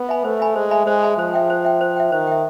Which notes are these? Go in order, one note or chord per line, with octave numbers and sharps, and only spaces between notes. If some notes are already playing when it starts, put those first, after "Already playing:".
Already playing: B3
E5 G#5 B5
A3 C5
E5 G#5 B5
G#3 C5
E5 G#5 B5
G#3 C5
E5 G#5 B5
F3 C5
E5 G5
C5
E5 G5
C5
E5 G5
D#3 C5
E5 G5